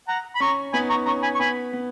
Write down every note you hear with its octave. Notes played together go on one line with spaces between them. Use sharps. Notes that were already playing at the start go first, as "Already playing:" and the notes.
F#5 A#5
B5
C#4 A#5 C#6
B3 D#4 G#5 B5
A#5 C#6
C#4 A#5 C#6
G#5 B5
C#6
B3 G#5 B5
B3